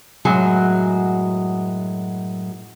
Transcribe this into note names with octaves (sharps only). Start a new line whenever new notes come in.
F#2 A2 F#3 G#3 G#5